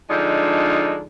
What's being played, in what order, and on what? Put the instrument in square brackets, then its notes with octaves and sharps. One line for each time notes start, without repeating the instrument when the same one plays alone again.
[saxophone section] D3 F3 G#3 D4 D#4